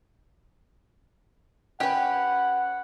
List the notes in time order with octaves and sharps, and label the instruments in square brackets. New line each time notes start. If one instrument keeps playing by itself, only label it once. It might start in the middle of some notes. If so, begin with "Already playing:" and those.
[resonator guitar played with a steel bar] C#4 B4 [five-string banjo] G4 G5 [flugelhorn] F#5